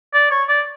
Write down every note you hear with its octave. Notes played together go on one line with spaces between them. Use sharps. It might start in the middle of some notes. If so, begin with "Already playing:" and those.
D5
C#5
D5